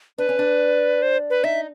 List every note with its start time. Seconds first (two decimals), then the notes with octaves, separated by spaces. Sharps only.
0.18 D4 B4
0.29 C#4
0.39 D4
1.02 C5
1.30 B4
1.44 D#4 E5